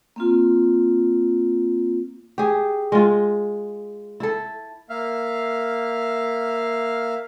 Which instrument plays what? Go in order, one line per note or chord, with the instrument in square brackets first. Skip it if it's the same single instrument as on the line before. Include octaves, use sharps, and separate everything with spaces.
[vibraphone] A#3 C4 F4
[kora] G4 G#4
G#3 F4
E4 A4
[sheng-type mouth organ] A#3 E5 F5 F6